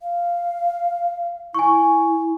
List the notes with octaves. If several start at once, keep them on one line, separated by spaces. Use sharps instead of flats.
F5
E4 G#5 C#6